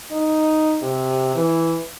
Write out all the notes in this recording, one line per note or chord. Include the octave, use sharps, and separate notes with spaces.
D#4
C3
E3